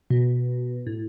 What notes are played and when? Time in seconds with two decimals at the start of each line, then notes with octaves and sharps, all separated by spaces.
0.10 B2
0.87 A2